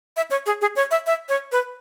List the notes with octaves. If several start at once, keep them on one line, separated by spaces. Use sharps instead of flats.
E5
C#5
G#4
G#4
C#5
E5
E5
C#5
B4